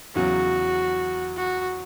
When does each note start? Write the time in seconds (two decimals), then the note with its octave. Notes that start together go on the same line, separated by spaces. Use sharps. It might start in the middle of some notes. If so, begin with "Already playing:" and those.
0.15 E2 C#3 F#3 F#4
1.37 F#4